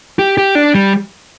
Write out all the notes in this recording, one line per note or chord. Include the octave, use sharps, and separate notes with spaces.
G4
G4
D4
G3